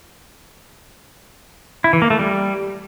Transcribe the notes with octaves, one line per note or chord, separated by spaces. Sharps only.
E4
E3
A#3
A3
G3